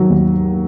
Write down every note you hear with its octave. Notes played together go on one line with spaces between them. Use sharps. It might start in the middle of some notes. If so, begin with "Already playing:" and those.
Already playing: D#3 F#3
D#2